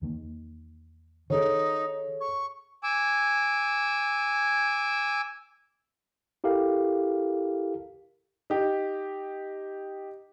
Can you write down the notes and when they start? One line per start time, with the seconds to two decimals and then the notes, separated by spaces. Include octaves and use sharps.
0.02 E2 D#3 A#3
1.30 D#3 D#4 G#4 A4 C#5
2.21 C#6
2.83 G#5 D6 E6
6.44 E4 G4 A4 A#4 F5
8.50 D#4 G4